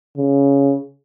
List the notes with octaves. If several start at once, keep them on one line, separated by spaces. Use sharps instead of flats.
C#3